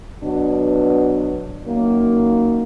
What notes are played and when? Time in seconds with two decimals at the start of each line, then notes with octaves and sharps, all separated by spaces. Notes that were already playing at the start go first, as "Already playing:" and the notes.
0.23 B2 F#3 B3 D4
1.65 F#2 D#3 F#3 A#3